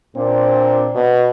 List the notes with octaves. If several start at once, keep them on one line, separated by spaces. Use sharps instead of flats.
A#2 C4 D4
B2